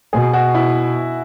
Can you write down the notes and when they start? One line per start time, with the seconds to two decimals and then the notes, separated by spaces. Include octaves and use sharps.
0.13 B2 G#4
0.33 F#4
0.55 E4